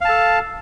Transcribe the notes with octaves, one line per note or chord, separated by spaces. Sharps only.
A4 F5 A5